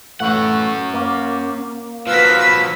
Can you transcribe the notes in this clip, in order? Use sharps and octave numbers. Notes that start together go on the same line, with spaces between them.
A2 E3 A3 C#4 F#5
A#3
F3 F#4 B4 F5 E6 B6